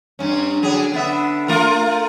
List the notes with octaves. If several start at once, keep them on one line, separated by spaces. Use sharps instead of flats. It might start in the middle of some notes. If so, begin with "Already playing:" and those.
G2 C#4
D3 F#3 G#4
D3 B3 E5
A3 F4 A#4